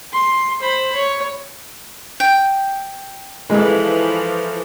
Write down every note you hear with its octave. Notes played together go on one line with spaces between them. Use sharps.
C6
C5 B5
C#5
G5
E3 F3 G#3 A4